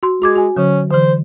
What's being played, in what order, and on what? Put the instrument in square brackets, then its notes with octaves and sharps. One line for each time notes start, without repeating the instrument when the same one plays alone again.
[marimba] F#4 C6
[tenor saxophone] G#3 [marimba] F#4 D6 G#6
[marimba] F#4 G#5
[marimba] D3 F#3 [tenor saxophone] C#4
[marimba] D3 E3 [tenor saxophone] C5